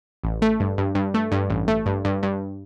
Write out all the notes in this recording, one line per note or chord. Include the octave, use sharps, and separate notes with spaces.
A1
A3
G2
G2
G2
A3
G2
A1
A3
G2
G2
G2